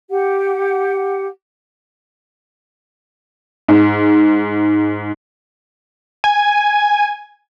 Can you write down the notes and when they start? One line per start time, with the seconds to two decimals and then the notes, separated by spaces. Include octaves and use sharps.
0.10 G4 F#5
3.68 G#2
6.24 G#5